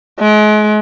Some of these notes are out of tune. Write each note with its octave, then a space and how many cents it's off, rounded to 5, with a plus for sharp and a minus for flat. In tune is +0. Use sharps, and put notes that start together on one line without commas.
G#3 +35